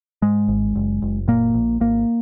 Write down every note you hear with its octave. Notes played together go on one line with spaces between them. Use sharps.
G#2 G#3
G#1
F#1
F#1
A#2 A#3
A#1
G#1 A#3